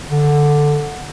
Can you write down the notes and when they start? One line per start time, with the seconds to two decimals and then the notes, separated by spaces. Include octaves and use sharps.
0.10 D3